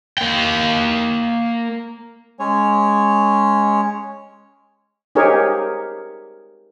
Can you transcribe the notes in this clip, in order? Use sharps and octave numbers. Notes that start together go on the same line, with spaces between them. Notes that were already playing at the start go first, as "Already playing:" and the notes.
A#3 G5
G#3 C#4 C#5
D#4 G4 G#4 A#4 C5 C#5